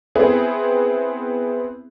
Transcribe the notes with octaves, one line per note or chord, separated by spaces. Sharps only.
B3 C4 E4 G#4